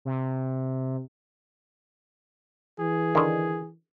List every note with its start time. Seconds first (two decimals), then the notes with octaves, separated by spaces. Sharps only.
0.05 C3
2.80 E3 G#4
3.15 D3 D#3